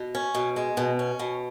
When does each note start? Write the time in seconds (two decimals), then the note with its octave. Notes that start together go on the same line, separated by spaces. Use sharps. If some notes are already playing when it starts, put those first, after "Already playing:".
Already playing: B2
0.15 C#4
0.35 B2
0.56 G#3
0.77 B2
0.99 C#4
1.19 B2